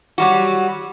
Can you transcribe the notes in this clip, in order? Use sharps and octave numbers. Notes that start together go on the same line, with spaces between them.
F#3 G3 F#4